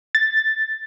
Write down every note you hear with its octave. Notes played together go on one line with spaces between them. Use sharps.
A6